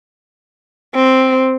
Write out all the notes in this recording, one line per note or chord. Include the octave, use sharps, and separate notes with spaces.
C4